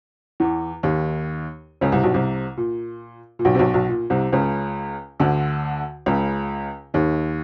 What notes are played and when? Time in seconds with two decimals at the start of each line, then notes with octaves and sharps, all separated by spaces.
0.40 E2 E3
0.83 D#2 D#3
1.81 C#2 C#3
1.92 C2 C3
2.03 B1 B2
2.14 C2 C3
2.57 A#2
3.39 A#2
3.45 B1 B2
3.55 C3
3.59 B1 B2
3.74 B1 B2
3.89 A#2
4.10 C2 C3
4.33 C#2 C#3
5.20 D2 D3
6.06 C#2 C#3
6.94 D#2 D#3